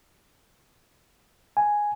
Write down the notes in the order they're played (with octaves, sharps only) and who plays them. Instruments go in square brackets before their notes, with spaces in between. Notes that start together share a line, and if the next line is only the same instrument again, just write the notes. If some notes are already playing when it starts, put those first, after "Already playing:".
[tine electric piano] G#5